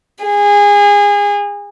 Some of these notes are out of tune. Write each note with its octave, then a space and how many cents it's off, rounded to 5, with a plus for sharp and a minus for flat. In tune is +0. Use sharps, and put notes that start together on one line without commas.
G#4 -25